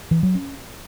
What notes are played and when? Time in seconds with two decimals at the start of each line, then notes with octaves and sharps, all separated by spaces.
0.11 E3
0.23 F#3
0.35 C#4